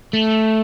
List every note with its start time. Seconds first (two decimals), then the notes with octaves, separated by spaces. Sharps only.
0.13 A3